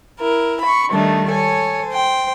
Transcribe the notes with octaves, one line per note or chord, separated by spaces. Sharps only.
E4 A#4
B5 C#6
D#3 G3 A3 D4 D#4
A4 C#5 G#5
C5 G5